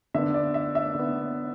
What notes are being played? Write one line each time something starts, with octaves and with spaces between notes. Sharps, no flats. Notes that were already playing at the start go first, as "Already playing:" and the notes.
D3 B3 E5
D5
E5
E5
D3 B3